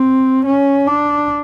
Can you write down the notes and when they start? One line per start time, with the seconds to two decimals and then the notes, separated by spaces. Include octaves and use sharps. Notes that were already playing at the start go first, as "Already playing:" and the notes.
Already playing: C4
0.45 C#4
0.87 D4